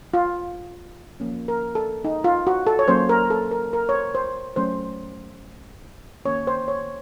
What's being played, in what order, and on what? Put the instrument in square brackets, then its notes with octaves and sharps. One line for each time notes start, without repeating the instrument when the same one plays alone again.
[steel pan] F4
F3 A#3 C#4
A#4
A4
D#4
F4
F#4
A4
C#5
F#3 A#3 C#4 C5
A#4
A4
A#4
A#4
C#5
C5
C5
F#3 A3 C#4 C5
D#3 A#3 C#4 C#5
C5
C#5